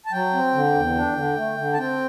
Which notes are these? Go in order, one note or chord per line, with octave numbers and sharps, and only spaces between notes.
A5
F#3 G5
C4
D3
E2
D4
D3
A3
D3
A5
C4 G5